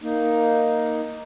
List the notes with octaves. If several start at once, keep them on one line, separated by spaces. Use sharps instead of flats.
A#3 D#4